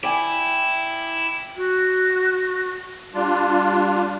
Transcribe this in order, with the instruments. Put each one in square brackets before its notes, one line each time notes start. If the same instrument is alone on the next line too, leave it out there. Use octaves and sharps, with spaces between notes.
[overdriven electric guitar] E4 [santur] D5 G5 G#5
[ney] F#4
[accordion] G3 D4 F4